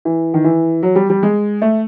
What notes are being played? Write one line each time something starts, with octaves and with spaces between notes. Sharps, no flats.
E3
D#3
E3
F#3
G3
G3
G#3
A3